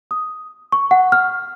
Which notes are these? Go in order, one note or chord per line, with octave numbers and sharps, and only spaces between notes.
D#6
C#6
F#5
F6